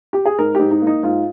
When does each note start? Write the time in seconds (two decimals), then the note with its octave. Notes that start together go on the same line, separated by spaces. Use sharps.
0.13 G4
0.25 G#4
0.38 G#2 A#4
0.55 G#2 G4
0.71 D#4
0.82 A#3
0.87 D#4
1.03 G#2 F4